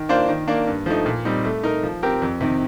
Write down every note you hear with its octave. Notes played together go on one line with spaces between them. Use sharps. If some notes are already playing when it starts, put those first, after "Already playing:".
Already playing: D#3
A#3 D4 F4 C5
D#3
A#3 D4
G2
F3 A3 D#4
A#2
G3 C4 D#4
A3
D#4 A#4
F3
C4 G4 A#4
F2
C3 D#3